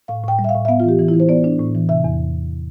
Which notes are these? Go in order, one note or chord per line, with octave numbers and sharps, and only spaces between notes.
A2 F5
A2 G5
G3
E5
F5
A2
E5
B3 F5
F4
E3 G4
E3
E4
E3
C5
B3 D5
D4
A2
E3
C3 E5
E2